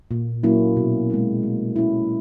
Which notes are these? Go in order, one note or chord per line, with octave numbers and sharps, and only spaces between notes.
A#2
F#3 A#3 C#4 E4
B2
G#3 C4 E4
A3
C#4 E4